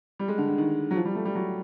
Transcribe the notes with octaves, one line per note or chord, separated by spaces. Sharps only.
G3
G#3
D3
D3
D#3
F#3
F3
G3
A3
G3
F#3